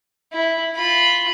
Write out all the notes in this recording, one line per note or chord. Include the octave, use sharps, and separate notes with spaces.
E4
F4 B5